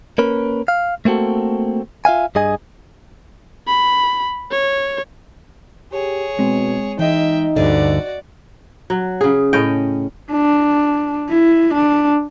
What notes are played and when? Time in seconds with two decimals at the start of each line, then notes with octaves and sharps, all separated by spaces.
0.18 A#3 C#4 A#4 B4
0.68 F5
1.05 A3 A#3 C4 F#4 A4
2.05 F4 E5 F5 G#5
2.35 G2 G#4 D#5 G#5
3.67 B5
4.51 C#5
5.92 G4 G#4 C#5
6.39 B2 G#3 C4
6.99 E3 G#3 D#4 D#5 E5 G5
7.56 D2 G2 D3 F#4 D5 D#5
8.90 F#3
9.21 C#3 G#4
9.53 A2 C#4 D#5 G5
10.31 D4
11.30 E4
11.74 D4